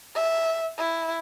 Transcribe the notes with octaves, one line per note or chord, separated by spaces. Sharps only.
E5
E4